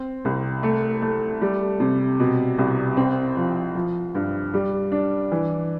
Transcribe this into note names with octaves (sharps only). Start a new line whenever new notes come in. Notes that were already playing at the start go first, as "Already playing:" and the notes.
Already playing: C4
C2
A3
A3
G3
C3
B2
C2
C4
F3
F3
G2
G3
D4
E3